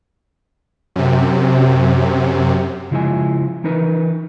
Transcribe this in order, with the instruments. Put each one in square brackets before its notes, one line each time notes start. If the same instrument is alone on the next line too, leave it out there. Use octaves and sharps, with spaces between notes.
[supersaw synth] F#2 C3
[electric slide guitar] C#3 F3 G#3 E4 D#5 G#5
E3 D#4 A#4 B4